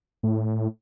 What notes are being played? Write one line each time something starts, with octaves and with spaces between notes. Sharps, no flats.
A2